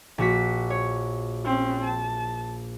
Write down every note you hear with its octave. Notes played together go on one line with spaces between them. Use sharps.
A#1 F#4 B6
C#5
C4 C#4
A5